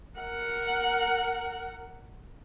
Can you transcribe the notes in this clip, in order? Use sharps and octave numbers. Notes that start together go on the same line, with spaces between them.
A#4 F#5